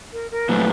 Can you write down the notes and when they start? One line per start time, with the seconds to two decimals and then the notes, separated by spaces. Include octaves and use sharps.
0.13 A#4
0.31 A#4
0.49 A#2 F#3 A3 B4